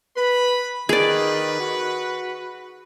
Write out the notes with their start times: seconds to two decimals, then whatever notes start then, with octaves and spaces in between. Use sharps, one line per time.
0.17 B4 B5
0.89 D#3 G#4 B4 D5
1.60 F#4